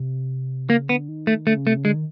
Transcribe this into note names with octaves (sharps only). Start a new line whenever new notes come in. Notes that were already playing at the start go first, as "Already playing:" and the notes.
Already playing: C3
C#3 A#3
D3 B3
D#3
A3
D3 A3
C#3
C3 A3
C#3
D3 G#3
D#3